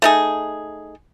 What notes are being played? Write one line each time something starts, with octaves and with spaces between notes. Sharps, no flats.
A3 D#4 G#4